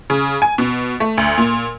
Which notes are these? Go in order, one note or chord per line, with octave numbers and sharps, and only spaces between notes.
C#3
G#5
B2
A3
D2
A#2